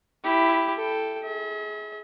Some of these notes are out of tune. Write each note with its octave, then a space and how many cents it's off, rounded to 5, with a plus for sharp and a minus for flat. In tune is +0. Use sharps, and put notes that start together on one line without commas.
E4 +0 G4 +0
A4 +0 G5 +0
G#4 +20 E5 -45